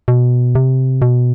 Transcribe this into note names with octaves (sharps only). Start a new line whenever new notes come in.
B2
C3
B2